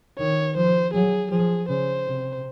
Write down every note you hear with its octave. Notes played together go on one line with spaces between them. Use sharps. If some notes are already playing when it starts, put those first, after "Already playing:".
D#3 C#5
F3 C5
F#3 G#4
F3 G#4
C#3 C5
C3